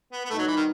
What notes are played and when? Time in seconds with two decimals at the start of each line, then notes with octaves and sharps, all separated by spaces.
0.12 B3
0.25 B3
0.30 B2 G3 A3 D#4
0.39 F#3
0.47 E3
0.56 D#3